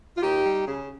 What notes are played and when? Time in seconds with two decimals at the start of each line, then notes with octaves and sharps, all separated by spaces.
0.17 F4
0.22 D#2 D#4 G4
0.45 G3
0.66 C#3 G#4